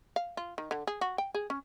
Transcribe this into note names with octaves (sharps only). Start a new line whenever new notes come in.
F5
F4
D#3
D3
G#4
F#4
G5
G#4
C#4